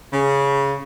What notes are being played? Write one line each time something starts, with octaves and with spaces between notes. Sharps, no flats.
C#3